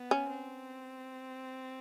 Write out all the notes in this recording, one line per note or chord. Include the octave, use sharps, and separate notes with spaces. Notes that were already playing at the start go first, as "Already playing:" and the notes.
Already playing: B3
C#4
C4